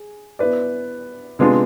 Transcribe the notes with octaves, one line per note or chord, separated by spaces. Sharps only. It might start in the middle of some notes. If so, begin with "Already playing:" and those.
Already playing: G#4
B3 E4 B4 D5
C3 G#3 B3 D4 F4